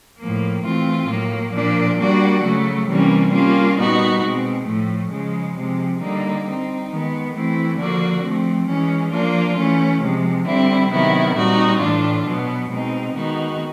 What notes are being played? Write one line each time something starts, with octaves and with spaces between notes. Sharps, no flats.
A2 F3 A#3
E3 A3 C4 F4
A2 F#3 A#3
A#2 F3 A#3 D4
G3 A#3 D4 F#4
C#3 F#3 A3
C3 E3 G3 A#3 C#4
G3 A#3 C#4 F4
A#2 G3 B3 D#4 F#4
B2 G#3 C4
A2 F3 A3
C#3 F3 G#3
C3 F3 G#3
D3 G3 A#3 D#4
G3 C4 D#4
D#3 G#3 B3
E3 A3 C4 E4
D3 F3 A#3 D4 F#4
F3 A3 C4
E3 G#3 C#4
F3 A#3 D4 F4
E3 A3 C#4
C3 F3 G#3
D3 G3 C4 E4
C3 D#3 F#3 B3 E4
A#2 G3 C4 D#4 F#4
A2 E3 A3 D4 F4
B2 F#3 B3
B2 G#3 C4 D#4
D#3 G#3 B3 D#4 F#4